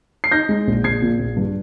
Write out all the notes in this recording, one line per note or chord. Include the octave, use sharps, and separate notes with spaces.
C7
D#4 G6 A#6
G#3
A#1
A#1 G#6 C7
A#2
A#1
G2